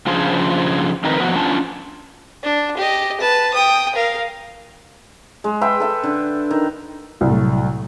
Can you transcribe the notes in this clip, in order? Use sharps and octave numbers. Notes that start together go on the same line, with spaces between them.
C#3 F3 D4 F4 G#4 C5
D#3 C4 D#4 A#4 B4
F3 B3 F#4
C#4 D4 F4 A5
D4
G4 D#5
B4 A5
G5 D#6
A#4 F5
G#3
B4 E5 G5 C6
A4 E5
D3
D#3
C2 A2 F#3 A3